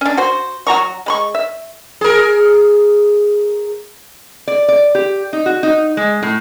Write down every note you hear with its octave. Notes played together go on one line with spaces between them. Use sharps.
C#4 D4
F#4 C5
F#3 F#4 A#5 C#6
G#3 B5 C#6
E5
G#4 A#4
D5
D5
G4
D#4
F#4
D#4
G#3
A2